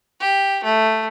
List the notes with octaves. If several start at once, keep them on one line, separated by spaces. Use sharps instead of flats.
G4
A3